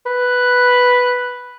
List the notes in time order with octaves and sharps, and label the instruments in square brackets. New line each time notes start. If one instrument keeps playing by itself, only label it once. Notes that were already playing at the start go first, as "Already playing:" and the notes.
[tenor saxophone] B4